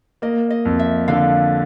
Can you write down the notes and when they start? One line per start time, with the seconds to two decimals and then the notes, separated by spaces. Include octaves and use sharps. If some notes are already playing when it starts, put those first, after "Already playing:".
0.22 A#3 D#5
0.50 D#5
0.65 F2
0.79 E5
1.08 D3 F5